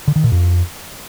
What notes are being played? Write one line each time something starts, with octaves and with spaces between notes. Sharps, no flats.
D3
D#3
A#2
F2